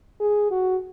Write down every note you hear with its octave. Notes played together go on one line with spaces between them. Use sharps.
G#4
F#4